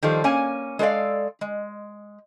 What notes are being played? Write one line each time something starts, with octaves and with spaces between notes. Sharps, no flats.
D#3 F3 G3 A4 C5
A#3 C#4 G#5
G#3 A4 B4 D5 F5
G#3